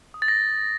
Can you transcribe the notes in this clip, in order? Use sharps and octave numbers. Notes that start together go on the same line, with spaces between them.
D#6
A6
A#6